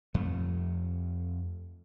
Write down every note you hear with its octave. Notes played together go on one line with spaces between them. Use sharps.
F2 A3